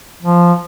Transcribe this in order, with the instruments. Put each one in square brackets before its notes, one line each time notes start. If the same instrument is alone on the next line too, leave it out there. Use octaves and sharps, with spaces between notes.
[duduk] F3